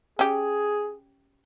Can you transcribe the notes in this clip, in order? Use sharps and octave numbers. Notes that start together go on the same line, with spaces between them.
C#4 G4 G#4